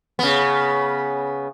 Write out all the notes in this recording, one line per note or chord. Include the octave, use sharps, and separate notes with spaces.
C#3 B3